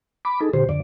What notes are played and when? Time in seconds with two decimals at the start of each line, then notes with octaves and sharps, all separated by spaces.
0.25 B5 D6
0.41 D#4 G#4 A4
0.54 A#2 D3 G4 C5
0.69 F2 D3 D5